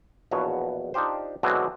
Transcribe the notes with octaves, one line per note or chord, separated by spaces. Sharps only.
A#1 E2 B2 B3 F#4 C#5
D4 D#4 F4 G4 C5
B2 D3 E3 F#3 G#3 C4